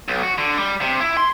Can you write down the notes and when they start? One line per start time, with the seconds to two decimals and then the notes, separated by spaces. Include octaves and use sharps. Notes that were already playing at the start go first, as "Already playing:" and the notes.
0.08 B1
0.23 F#4
0.38 D3
0.57 G3
0.81 C3
1.00 E4
1.17 C6